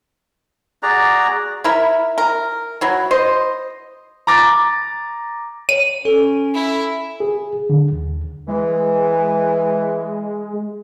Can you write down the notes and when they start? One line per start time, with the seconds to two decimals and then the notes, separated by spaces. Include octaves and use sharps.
0.83 F#4 G#4 D5 A#5
1.64 E4 A#4 E5
2.18 A#4
2.81 F#3 E4
3.11 C5 D#5
4.27 A#5 D6 A6
5.69 C#5 D#7
6.05 C#4 A4
6.54 E4
7.20 G#4
7.70 D3
7.92 D#2
8.48 E3 G#3